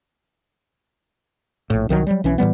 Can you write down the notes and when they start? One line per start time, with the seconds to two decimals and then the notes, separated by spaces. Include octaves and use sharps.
1.70 A#1 A2
1.89 C2 D#3 F3 F#3
2.07 F#3 G3
2.24 B1 E3 C#4
2.38 A2 E3 G3 B3